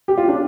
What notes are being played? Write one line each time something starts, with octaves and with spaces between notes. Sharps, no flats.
G4
F4
D4